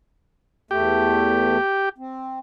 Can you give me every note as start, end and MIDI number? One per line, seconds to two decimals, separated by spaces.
0.71 1.58 40
0.71 1.58 57
0.71 1.89 67
1.98 2.39 60